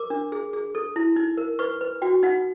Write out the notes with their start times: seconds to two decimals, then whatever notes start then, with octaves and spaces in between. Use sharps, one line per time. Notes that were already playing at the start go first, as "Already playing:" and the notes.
Already playing: A#4 D6
0.10 D4
0.32 G#4
0.53 G#4
0.75 A4
0.96 E4
1.16 D#4
1.37 A#4
1.59 B4 C#6
1.81 B4
2.02 F#4 G5
2.23 D#4 F#5